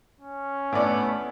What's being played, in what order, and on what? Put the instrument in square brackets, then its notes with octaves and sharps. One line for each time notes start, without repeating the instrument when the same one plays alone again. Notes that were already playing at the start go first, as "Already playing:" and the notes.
[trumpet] C#4
[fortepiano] A2 D5 [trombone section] A3 B3